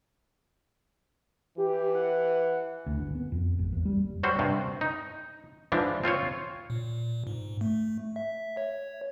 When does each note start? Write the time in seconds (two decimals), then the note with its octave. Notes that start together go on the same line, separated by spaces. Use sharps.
1.58 E3 G4
1.95 F#5
2.86 D2
3.00 G1
3.15 B3
3.32 F2
3.59 G#1
3.73 E2
3.85 G3
3.99 F#1
4.23 F#3 G3 F#4 C5
4.39 G2 C3
4.81 D#4
5.72 G#2 E3 F3 D4
6.04 C4 F4 C5 C#5
6.70 A#2
7.27 G#2
7.61 A3
8.16 E5
8.57 C#5